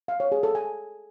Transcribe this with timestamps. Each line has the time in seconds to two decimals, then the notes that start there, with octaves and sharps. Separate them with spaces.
0.08 F5
0.20 C#5
0.32 G#4
0.43 A4
0.55 G#5